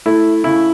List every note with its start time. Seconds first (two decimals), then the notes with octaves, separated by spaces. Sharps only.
0.06 A3 E4
0.44 C#3 E4